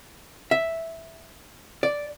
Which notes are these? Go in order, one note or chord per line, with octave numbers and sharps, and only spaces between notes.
E5
D5